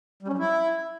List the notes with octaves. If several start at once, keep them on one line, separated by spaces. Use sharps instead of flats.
G3
C#4
F#3
E4